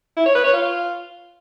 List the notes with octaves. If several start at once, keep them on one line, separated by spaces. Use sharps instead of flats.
E4
C#5
B4
C#5
F4